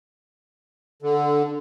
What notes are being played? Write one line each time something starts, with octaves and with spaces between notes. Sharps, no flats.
D3